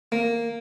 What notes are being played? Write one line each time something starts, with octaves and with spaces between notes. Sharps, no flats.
A#3